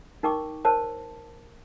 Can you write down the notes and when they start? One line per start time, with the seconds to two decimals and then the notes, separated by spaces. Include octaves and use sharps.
0.23 D#4 A#4 G5 C#6 D6
0.65 A#4 C5 C#5 A5